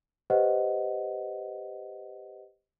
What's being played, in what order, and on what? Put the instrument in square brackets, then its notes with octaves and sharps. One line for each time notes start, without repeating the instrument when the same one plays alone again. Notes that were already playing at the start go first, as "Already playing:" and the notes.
[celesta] G4 B4 C5 D#5 F#5